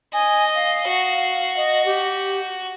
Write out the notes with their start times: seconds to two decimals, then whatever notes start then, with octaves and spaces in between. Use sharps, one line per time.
0.13 D#5 G#5
0.55 F5
0.88 F#4
1.57 D#5
1.86 G4